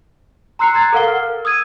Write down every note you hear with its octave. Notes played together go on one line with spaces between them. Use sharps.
A#5 C6 E6 F#6 C7 C#7
A#5 G#6 A6
A4 A#4 F5 F#5 C7 G7
F6
A#4
D#6 E6 G#6 D#7